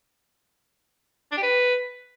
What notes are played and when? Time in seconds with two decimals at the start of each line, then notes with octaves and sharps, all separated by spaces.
1.32 D4
1.37 G4
1.43 B4